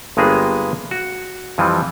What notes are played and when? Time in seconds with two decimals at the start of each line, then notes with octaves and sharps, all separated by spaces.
0.17 G1 G2 G#3 A#3 B3 G#4
0.91 F#4
1.58 F2 E3 F3 G3 C4